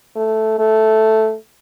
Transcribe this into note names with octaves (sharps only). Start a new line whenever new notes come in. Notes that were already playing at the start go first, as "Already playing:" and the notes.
A3
A3